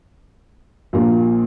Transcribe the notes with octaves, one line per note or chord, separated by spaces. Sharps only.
A#1 A#2 A#3